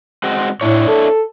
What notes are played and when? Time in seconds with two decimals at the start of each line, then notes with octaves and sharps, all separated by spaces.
0.24 G#3 C4 F#4
0.61 A2 D4 E4 C#5
0.88 A4